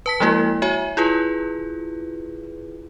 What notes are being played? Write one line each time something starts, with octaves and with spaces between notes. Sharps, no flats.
B4 A5 B6
F3 G#3 A#3 E4 F#4
F#4 C#5 E5 G#5
E4 F4 G#4 B4